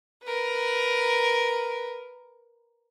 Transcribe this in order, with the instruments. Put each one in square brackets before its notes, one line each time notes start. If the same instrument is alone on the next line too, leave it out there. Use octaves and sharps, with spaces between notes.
[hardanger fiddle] A#4 B4